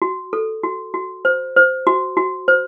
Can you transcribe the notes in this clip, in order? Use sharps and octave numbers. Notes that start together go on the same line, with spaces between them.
F#4
A4
F#4
F#4
C5
C5
F#4
F#4
C5